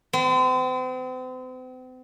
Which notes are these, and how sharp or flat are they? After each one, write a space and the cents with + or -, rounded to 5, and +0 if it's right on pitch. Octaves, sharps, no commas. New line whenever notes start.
C4 -40